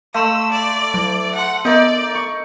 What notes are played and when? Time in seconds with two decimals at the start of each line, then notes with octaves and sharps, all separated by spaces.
0.14 A3 F5 C6 C#6 E6
0.52 D5
0.94 F#3
1.35 F#5 A5 C6
1.65 B3 D#4 A#4 D5
2.15 C#6